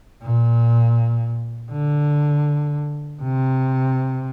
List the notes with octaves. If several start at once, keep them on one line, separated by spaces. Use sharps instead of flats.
A#2
D3
C3